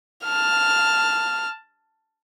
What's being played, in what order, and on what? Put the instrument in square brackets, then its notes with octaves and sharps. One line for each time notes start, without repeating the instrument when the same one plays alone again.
[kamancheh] A5 F6